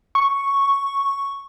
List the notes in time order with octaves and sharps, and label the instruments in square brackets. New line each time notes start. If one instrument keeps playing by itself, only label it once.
[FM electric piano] C#6